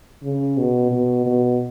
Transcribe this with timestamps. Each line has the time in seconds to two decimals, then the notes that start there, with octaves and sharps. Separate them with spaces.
0.23 C#3
0.58 B2
0.91 B2
1.26 B2